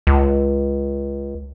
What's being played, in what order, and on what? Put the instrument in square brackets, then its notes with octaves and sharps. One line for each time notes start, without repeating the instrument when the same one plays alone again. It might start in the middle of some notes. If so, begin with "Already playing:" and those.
[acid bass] C#2